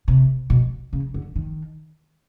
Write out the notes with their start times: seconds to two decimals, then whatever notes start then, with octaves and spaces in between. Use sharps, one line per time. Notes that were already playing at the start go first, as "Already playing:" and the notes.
0.08 C3
0.50 B2
0.93 C#3
1.14 D3
1.36 D#3